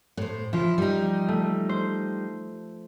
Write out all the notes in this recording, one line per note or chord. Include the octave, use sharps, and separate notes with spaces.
A2 C5
F3 E4 F4
G3 D#4
A3
C5